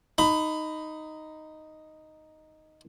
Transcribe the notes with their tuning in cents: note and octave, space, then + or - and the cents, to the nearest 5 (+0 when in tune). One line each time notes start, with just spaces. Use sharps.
D#4 +0 B5 +20